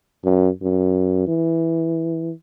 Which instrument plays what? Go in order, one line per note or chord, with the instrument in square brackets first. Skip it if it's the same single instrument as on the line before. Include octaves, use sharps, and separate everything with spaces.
[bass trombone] F#2
F#2
E3